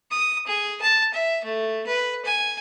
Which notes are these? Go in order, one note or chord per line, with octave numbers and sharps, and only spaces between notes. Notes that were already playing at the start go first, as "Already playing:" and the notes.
D#6
G#4
A5
E5
A3
B4
G#5